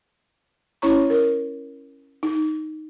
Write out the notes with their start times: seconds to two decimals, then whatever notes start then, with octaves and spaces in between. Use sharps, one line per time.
0.82 C#4 E4 C#5 A#5 C#6
1.10 A#4
2.23 D#4